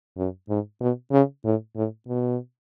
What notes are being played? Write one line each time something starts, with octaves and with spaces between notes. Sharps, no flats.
F#2
G#2
B2
C#3
A2
A2
B2